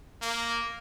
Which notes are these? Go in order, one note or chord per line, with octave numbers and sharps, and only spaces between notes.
A#3